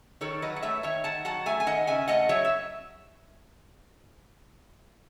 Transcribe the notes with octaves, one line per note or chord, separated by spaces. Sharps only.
D#3 A4 C#5
F#3 B4 D#5
F#5
A3 C#5 E5
D#3 C#5 E5
D#3 F#5 A5
F#3 F#5 A5
A3 E5 G#5
G#5
D#3 D#5 F#5
C#3 E5 G#5
A3 D#5 F#5
F#3 C#5 E5
E5